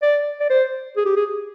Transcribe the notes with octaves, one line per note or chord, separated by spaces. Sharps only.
D5
D5
C5
G#4
G4
G#4